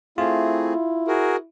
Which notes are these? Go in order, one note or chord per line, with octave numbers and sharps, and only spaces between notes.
A3 C4 E4 F4 G#4
F#4 G#4 A#4